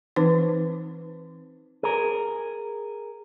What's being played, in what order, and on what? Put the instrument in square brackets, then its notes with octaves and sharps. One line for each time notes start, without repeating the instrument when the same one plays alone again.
[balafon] E3 C4 D#4 B4 C5
[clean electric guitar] G#4 A#4